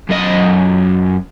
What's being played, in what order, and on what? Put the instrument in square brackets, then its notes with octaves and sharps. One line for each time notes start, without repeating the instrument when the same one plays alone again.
[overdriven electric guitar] F#2 D#5